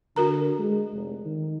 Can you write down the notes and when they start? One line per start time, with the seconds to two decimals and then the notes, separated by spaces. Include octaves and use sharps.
0.16 D3 F#4 A#4 A#5
0.59 G#3
0.93 F1
1.25 D#3